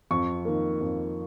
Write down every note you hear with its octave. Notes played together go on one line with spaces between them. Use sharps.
F2 C#6
D#3 A#3
F2